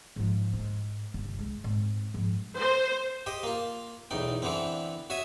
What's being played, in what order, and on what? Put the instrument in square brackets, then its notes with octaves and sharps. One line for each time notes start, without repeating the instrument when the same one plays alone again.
[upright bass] G#2 F3
G#2
G1 C2
G#3
G#2 C4
G#2 F3
[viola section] C5
[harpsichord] G4 C5 D#5
A#3 F4
B1 E2 D#4 G5
D3 E3 B3 C4
F#4 C#5 E5 D#6